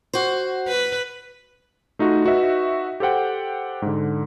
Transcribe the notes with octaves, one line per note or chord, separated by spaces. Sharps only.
F#4 C5
B4
A3 D#4 F4 F#4
D#4 F#4 B4 D#5 E5
G4 A4 C5 F#5 G5
G#2 D3